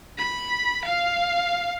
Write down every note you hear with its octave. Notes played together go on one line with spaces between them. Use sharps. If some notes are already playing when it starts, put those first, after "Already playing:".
B5
F5